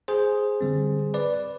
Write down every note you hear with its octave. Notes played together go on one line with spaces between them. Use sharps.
G#4 C5
D3 G3 C4
B4 D5